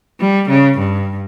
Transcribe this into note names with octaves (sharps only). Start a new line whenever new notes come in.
G3
C#3
G2